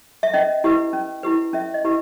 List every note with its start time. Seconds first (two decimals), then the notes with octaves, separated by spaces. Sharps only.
0.23 E5
0.33 C#4 D#5
0.64 E4 G4 B4
0.93 C#4
1.23 E4 G4 B4
1.53 C#4 E5
1.74 D#5
1.84 E4 G4 B4